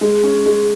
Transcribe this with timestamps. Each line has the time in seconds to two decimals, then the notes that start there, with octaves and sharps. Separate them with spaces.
0.01 G#3
0.24 C#4
0.46 G#3